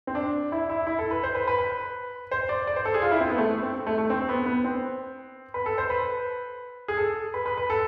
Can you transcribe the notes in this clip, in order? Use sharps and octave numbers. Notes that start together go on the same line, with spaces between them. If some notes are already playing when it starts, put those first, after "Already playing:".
C4
D4
E4
E4
E4
A4
B4
C5
B4
B4
B4
C5
D5
D5
C5
A4
G#4
F4
E4
C4
B3
A3
C4
A3
A3
C4
B3
B3
C4
B4
A4
C5
B4
G#4
A4
B4
B4
B4
A4